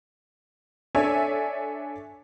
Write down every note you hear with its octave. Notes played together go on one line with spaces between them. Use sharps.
D4 A4 C#5 E5 G#5